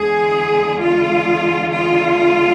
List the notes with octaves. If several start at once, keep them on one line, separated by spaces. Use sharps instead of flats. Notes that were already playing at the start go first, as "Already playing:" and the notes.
Already playing: E2 D3 G#3 G#4
F4
F4